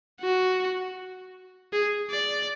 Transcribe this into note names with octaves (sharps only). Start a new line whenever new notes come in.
F#4
G#4
D5